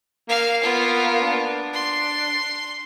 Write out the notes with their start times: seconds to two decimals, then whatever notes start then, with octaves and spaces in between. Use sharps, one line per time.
0.29 A#3 F5
0.63 B3 F4
1.21 D4
1.73 C6